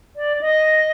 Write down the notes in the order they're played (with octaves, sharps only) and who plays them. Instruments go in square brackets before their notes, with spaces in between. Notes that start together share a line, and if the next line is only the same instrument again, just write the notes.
[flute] D5
D#5